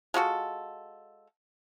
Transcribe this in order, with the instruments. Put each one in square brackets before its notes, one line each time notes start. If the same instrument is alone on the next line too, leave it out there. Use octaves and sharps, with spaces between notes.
[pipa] G#3 F4 F#4 A4